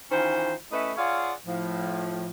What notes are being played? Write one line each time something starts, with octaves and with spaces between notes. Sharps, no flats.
D#3 E3 C#4 F4 C5
A3 C#4 E4 B4 D#5 E5
F4 G#4 C#5 D5 F5 F#5
A2 F3